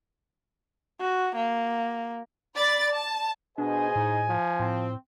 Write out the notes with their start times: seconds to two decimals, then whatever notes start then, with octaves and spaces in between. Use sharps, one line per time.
1.00 F#4
1.36 A#3
2.55 D5 B5 A6
2.91 A5
3.58 B2 D4 G#4 C5 D#5 G#5
3.96 A2 D#4
4.28 F3
4.60 A2 C4